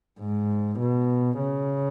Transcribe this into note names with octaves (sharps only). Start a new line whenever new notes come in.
G#2
B2
C#3